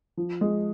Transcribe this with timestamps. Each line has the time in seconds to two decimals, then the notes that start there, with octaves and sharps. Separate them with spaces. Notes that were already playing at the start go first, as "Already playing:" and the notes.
0.17 F3
0.41 G#3